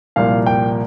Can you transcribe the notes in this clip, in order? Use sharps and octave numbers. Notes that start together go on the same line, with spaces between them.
C2 A#2 F3 F5
G5